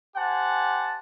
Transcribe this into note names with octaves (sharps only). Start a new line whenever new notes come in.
G4 C5 F#5 G#5 A5